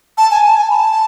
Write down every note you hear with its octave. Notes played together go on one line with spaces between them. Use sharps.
A5
G#5
A5
G#5
B5
A5